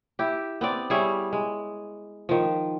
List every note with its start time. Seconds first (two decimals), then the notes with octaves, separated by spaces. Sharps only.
0.19 E4 G4
0.61 B3 C4 D5
0.90 G3 E4 G#4 C#5
1.33 G#3
2.29 D#3 F3